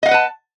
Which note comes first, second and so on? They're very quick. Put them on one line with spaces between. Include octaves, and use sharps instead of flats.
D#5 F5 F#5 B4 A5